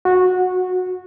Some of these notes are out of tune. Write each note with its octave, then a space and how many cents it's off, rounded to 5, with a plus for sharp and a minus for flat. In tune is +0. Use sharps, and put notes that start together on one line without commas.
F#4 -15